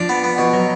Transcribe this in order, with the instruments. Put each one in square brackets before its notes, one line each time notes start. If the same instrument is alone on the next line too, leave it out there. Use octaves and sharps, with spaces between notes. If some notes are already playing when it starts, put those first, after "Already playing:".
Already playing: [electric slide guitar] F3 [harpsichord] D4
[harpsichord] B3
B3
B2
[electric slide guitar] F#3